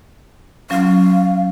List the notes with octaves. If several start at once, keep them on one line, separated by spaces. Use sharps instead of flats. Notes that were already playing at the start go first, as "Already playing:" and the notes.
F#3 C#4 F5